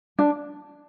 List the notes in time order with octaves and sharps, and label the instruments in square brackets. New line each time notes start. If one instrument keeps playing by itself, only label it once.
[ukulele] D4